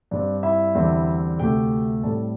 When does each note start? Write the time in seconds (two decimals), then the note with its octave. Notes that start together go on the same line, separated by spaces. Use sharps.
0.11 G2 G3 C4 D4 D5
0.43 E4 E5
0.75 E2 D3 G3 C4
1.39 D2 C3 A3 G4 G5
2.03 A2 G3 C4 A4 A5